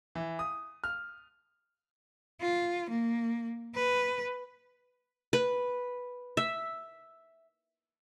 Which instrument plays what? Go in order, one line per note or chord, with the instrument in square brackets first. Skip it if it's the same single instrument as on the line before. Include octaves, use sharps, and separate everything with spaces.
[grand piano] E3
D#6
F6
[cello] F4
A#3
B4
[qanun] B4
E5